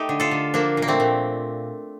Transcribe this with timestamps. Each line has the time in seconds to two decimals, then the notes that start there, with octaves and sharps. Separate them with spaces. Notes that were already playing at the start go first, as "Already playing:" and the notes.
Already playing: A3 D#4 G4
0.09 D3
0.20 F4 A4
0.31 D3
0.54 F3 A#3 D4
0.77 A#2
0.82 A#3
0.88 A3 C4
1.00 A#2